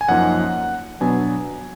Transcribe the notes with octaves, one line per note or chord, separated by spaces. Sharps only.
G#5
F#2 F3 A#3 D#4 F#5
B2 F#3 B3 D4 G#5